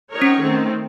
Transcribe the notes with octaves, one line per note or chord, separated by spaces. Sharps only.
C4 D#4 A#4 C#5
C#4
D#3 A3 C4